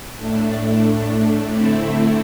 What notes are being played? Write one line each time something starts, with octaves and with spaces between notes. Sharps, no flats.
A2 A3 D4
D3 A3 C4 E4